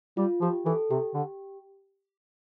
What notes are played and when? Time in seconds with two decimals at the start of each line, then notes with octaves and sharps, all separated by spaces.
0.17 G3 F4
0.41 F3 G4
0.66 E3 A4
0.91 C3 G4
1.14 D3